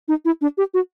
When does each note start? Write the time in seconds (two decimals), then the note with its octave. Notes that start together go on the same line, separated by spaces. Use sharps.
0.08 D#4
0.25 E4
0.41 D4
0.58 G4
0.74 F#4